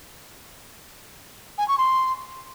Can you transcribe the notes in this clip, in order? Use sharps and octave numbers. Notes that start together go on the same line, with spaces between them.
G#5
C#6
C6